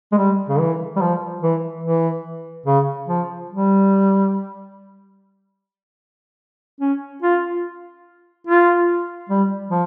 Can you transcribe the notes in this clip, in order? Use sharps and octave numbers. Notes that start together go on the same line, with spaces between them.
G#3
G3
C#3
E3
G3
F3
E3
E3
C#3
F3
G3
C#4
F4
F4
G3
F3